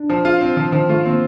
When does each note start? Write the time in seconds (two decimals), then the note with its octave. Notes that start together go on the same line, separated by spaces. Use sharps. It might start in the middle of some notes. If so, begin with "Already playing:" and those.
Already playing: D4
0.10 F3
0.25 F4
0.41 C4
0.56 D#3 F3
0.72 D#3 F3
0.89 A3 F4
1.04 A#3 C4